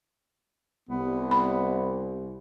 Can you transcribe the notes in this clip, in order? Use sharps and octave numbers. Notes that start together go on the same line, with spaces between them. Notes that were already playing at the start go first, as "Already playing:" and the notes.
C2 B3
B5